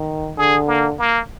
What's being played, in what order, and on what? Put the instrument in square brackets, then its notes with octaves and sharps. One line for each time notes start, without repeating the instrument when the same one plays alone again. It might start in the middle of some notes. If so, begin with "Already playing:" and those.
Already playing: [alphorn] D#3
[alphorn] D3 [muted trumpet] G#4
[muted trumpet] A#3
A#3